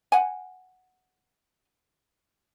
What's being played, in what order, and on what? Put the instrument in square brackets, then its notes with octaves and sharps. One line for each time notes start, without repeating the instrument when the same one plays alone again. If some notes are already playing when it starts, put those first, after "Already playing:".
[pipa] F#5 G#5